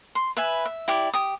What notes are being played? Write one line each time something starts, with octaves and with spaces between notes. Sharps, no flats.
C6
B4 E5 G#5
E5
E4 G4 D5
G4 D#6